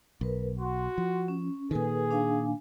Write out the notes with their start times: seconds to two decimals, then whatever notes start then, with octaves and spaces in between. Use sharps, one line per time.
0.21 B1 A#4 B4
0.59 F#4 C6
0.98 F3
1.28 C#4
1.71 A#2 D#3 G#4 A4 B4 G#5
2.11 D4 F5 G#5